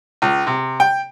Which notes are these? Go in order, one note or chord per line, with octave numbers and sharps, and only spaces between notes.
C#2
C3
G5